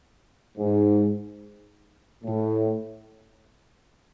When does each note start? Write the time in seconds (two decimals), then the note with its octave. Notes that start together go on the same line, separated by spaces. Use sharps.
0.58 G#2
2.24 A2